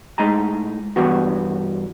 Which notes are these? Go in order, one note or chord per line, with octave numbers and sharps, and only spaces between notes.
A2 G#3 D#4 G#5 A#5
G2 E3 G3 B3 F#4